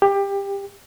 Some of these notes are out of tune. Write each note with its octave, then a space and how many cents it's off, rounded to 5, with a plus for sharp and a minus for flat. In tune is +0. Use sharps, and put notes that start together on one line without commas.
G4 +20